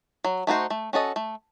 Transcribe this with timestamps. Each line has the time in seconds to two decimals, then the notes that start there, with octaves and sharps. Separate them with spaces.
0.24 F#3
0.47 A3 D#4 F#4 C5
0.70 A3
0.93 C#4 F#4 A4 D#5
1.16 A3